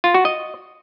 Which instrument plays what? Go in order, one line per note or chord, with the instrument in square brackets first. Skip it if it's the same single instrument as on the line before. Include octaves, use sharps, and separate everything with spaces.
[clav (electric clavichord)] F4
F#4
D#5